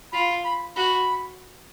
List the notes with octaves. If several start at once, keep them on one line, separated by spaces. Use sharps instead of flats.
F4 B5
B5
F#4 B5